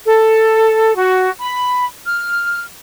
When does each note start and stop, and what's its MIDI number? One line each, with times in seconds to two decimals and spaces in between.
0.06 0.95 69
0.96 1.29 66
1.40 1.85 83
2.06 2.63 89